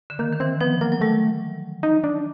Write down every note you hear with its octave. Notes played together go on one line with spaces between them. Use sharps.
D3
D#3 A#3
D#3
E3 C4
F3 B3
F#3 A#3
F#3
G3 A3
D#4
D4